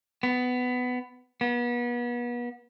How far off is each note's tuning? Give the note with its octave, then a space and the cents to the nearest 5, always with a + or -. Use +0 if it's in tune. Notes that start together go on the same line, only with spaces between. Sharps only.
B3 +15
B3 -35